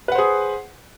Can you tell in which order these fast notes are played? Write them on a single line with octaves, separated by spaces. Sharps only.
B4 F#5 C5 G#4